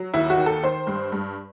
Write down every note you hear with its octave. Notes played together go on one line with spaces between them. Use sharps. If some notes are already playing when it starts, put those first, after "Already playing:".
Already playing: F#3
D#2 E4
F#4
D#3
A4
D#3 C5
G2
G2